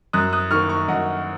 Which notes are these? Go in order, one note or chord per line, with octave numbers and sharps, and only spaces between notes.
F#2 D#6 F#6
D#6 F#6
D#3 A#3 C#6 F6
A#5 C#6
F#2 D#5 F#5